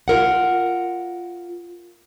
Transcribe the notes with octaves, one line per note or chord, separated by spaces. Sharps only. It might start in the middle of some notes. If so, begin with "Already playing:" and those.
F4 A#4 F#5